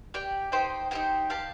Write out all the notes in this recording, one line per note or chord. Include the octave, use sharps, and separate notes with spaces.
G4 D5 G5
D#4 G4 C5 G5
D#4 G4 C5 G5
G4 D5 F5 A5